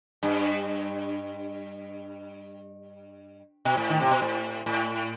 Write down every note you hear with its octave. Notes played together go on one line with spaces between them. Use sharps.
G2
B2
A2
D#3
C3
B2
A2
A2